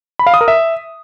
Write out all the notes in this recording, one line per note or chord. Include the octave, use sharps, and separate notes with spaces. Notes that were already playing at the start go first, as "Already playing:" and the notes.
B5
F5
D#6
A#4
E5